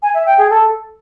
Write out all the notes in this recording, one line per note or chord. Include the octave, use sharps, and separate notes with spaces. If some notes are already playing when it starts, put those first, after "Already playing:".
G#5
E5
G5
G#4
A4